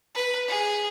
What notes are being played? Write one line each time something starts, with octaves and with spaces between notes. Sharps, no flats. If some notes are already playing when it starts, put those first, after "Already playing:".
B4
G#4